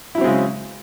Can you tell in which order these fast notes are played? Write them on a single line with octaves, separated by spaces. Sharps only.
E4 F#3 C4 G#3 C#3